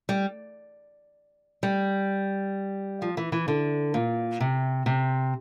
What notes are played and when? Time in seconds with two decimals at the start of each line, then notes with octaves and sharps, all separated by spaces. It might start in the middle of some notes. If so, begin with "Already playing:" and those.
0.09 G3
1.63 G3
3.02 F3
3.17 E3
3.32 E3
3.48 D3
3.94 A#2
4.41 C3
4.86 C3